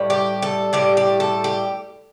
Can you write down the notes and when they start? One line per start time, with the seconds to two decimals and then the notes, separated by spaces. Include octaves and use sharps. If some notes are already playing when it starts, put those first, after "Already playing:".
Already playing: A2 G3
0.10 G4
0.42 A4
0.73 A2 G3 G4
0.97 G4
1.20 A4
1.44 G4